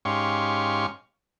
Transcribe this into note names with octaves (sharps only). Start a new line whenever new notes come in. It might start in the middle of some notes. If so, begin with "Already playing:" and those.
G#2 C#4 G4 F5 C6 C#6